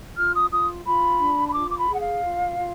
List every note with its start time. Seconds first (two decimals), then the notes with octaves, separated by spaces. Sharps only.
0.16 F4 F6
0.34 D#6
0.50 F4 D#6
0.85 F4 B5
1.20 D4
1.48 B5
1.54 F4 D6
1.70 D6
1.78 B5
1.88 G#4
1.94 F#5
2.01 F5
2.24 F4
2.58 F4